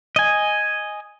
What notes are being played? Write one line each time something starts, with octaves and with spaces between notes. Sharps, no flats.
D#5 G#5